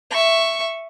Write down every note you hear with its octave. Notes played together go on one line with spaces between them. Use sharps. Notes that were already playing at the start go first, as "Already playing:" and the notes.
E5 C#6